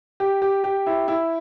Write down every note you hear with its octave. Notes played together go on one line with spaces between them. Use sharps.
G4
G4
G4
E4
E4